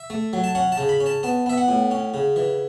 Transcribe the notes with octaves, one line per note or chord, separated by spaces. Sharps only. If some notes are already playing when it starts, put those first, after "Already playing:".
Already playing: E5
A3
F#3
A5
C#4 F#5
A5
C#3
B5
C#4
A5
B3 A5
B3 E5
F#5
A2
C#4
C#3
E3